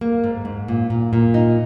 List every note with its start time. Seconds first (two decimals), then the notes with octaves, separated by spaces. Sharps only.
0.01 A#3
0.24 G#2
0.45 G#2
0.68 A#2
0.90 A#2
1.13 A#2
1.34 D#4